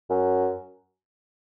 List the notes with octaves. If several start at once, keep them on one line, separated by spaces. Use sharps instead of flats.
F#2